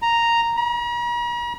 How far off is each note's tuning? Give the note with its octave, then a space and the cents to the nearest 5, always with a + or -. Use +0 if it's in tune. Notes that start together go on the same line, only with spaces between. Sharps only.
A#5 +0
A#5 +45